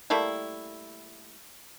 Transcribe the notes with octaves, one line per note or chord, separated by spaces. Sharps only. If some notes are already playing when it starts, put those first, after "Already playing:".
G3 A3 A#3 E4